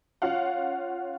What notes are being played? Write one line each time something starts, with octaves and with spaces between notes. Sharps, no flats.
C#4 F4 F5 F#5